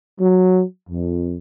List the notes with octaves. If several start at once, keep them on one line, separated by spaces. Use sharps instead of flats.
F#3
F2